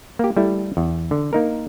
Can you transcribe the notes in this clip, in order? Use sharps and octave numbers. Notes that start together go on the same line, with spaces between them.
A#3 G4
G3 A3 E4
E2
D3
A#3 D#4 A#4